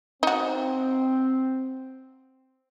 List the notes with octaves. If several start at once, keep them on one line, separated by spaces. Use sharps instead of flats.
C4 D#4 F#4